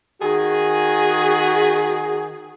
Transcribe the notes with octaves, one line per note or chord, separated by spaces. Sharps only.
D#3 F#4 G#4